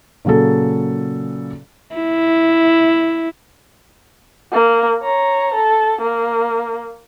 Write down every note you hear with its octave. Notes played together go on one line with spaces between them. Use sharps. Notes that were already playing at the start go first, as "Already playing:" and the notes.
A#2 C#3 F#3 G#4 A4
E4
A#3
C#5 A#5
A4
A#3